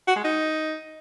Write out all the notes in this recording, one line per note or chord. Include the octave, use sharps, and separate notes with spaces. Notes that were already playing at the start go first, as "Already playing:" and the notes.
F#4
G#3
D#4